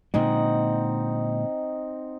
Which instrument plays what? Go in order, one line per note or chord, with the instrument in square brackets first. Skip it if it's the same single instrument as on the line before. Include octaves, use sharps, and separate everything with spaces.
[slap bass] A#2 D3 G#3 [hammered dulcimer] C4 D#4 F#5